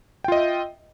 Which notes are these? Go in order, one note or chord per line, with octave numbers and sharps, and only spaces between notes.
F4 D#5 E5 G5